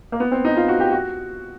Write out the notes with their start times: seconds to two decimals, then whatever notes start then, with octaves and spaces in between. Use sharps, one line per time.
0.12 A#3
0.20 B3
0.31 C4
0.44 D#4
0.57 F4
0.68 F#4
0.80 G4
0.92 F#4